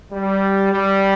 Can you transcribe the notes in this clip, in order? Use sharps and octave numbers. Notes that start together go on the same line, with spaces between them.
G3
G3